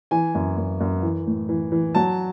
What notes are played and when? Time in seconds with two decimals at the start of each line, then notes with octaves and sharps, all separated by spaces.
0.11 E3 G#5
0.35 F#2
0.58 F#2
0.80 F#2
1.03 E3
1.27 A2
1.49 E3
1.72 E3
1.95 F#3 A5